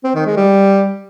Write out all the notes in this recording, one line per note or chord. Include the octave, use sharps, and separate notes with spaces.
C4
D#3
G#3
G3